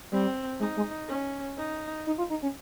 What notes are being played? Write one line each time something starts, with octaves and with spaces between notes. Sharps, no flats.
G3 C4
G#3 D#4
G#3
C#4
D#4
D#4
F4
D#4
C#4